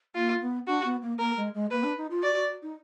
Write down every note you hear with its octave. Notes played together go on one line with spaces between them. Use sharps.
A#3 F4
B3
D4 F#4
B3
A#3
A#3 A#4
G#3
G#3
A#3 B4
D4
D#4
F4
F#4 D5
F#4
D#4